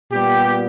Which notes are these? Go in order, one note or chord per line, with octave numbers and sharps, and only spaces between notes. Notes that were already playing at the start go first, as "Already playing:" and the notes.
A#2 G3 B3 G4